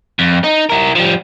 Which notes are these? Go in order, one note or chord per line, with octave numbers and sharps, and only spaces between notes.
F2
D#4
E4 A#4
F3 G3